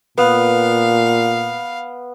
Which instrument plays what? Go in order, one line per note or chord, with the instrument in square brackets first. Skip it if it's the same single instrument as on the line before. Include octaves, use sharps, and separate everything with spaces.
[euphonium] A#2 [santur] B3 [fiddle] F5